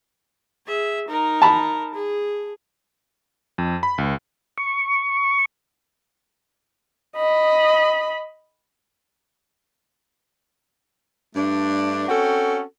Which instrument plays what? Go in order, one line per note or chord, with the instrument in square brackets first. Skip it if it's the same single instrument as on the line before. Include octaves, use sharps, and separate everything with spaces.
[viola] G#4 E5
D#4 A#4
[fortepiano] A5 B5
[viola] G#4
[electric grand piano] F2
B5
C#2
[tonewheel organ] C#6
[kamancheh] D#5 B5
[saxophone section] G2 A3 D4
C4 C#4 F#4 A4